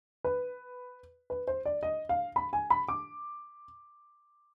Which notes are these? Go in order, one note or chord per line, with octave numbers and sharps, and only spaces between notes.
B4
B4
C5
D5
D#5
F5
B5
G#5
B5
D6